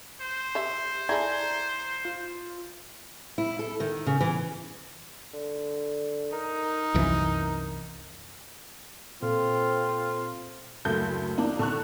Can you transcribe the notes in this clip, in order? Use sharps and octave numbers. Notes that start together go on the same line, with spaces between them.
C5
G4 C#5 E5
E4 G#4 A4 D5 A#5 G#6
F4
E4
A4
D#3
C#3
E3
D3
D#4 A#4
C2 F#2 E3
A#2 C4 F4 A4
F#1 D2 A4 G6
E3 A#3 D4 D#4
D3 A4 C#6 F#6